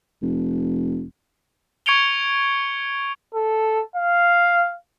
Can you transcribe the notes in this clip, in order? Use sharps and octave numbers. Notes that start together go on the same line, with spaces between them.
F1
C#6 G#6 C#7 D7 F7 G7
A4
F5